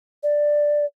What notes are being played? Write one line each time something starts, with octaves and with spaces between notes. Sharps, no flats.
D5